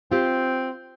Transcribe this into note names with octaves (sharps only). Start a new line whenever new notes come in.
C4 F4 G4